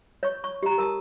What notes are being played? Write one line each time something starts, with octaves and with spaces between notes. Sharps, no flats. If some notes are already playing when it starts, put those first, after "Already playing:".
C#5 C#6
C#6
G4 A#5
A#4 A5 D#6